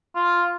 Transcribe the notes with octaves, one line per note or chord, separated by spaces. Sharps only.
F4